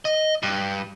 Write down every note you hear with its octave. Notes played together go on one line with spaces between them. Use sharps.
D#5
G2